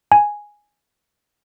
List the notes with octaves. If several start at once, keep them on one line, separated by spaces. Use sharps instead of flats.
G#5